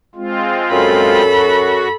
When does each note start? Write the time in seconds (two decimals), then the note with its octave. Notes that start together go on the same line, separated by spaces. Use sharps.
0.15 G#3 C4 F4
0.72 F#2 A4 B5
1.25 F#4